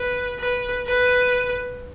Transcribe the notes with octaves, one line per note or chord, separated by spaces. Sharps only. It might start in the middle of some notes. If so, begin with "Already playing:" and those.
Already playing: B4
B4
B4